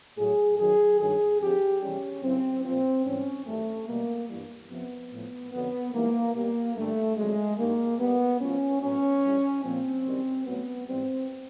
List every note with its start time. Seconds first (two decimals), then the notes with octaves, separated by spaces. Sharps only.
0.17 A2 F#3 G#4
0.58 F#2 D#3 F#3 G#4
0.99 G2 D#3 F#3 G#4
1.40 F2 D3 F3 G4
1.81 E2 C3 E3 G3 C#4
2.23 F#2 C#3 E3 C4
2.64 A#2 F3 C4
3.05 G#2 E3 G3 C#4
3.46 F#2 D#3 G3 A3
3.88 B2 G3 A#3
4.29 G2 E3 G3
4.69 F2 C3 F3 B3
5.11 A2 F3
5.52 F2 D3 F#3 B3
5.93 G#2 E3 G3 A#3
6.34 B2 G3 A#3
6.75 G2 D3 G3 A3
7.16 F2 D3 F#3 G#3
7.57 G2 D#3 G3 A#3
7.99 A#2 G3 B3
8.40 A2 F3 C#4
8.81 A2 F#3 C#4
9.22 G2 E3 G3
9.64 A#2 F3 C4
10.05 F#2 D#3 G3
10.45 A2 F#3 B3
10.87 G#2 E3 G3 C4